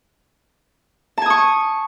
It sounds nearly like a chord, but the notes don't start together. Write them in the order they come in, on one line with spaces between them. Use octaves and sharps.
A5 G#5 D#6 C#6